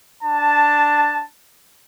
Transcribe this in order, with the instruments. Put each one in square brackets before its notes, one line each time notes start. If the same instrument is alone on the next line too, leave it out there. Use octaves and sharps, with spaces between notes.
[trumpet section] D4 A5